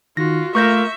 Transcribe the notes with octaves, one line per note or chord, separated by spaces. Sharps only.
D#3 F4 F#4 A#6
A3 A#3 F4 A#4 E5 C#6 G6 A#6